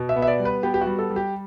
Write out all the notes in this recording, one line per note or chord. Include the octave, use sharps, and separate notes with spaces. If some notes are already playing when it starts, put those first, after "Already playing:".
Already playing: B2
E5
B3
E5
D5
G3
B4
B3 G4
G4
F#4
G3
A4
G3
G4